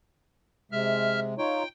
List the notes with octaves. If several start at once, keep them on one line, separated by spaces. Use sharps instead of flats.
C3 G#3 E5 F6
D#4 F4 C#5 G5